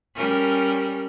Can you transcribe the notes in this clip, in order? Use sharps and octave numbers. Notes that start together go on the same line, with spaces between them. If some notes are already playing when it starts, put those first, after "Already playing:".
G3 C#4 A#4